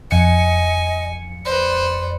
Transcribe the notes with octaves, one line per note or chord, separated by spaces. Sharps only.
F2 D#5 G#5 C#7
B4 C5 D5